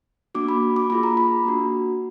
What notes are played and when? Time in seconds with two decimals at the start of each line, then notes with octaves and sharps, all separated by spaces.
0.35 A#3 D4 F#4 D6
0.48 B5
0.76 D6
0.90 A#3 F4 G#4 B5
1.03 A#5
1.17 B5
1.45 A#3 D4 F#4